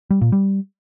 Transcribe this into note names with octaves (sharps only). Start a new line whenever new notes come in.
G3
A#2
G3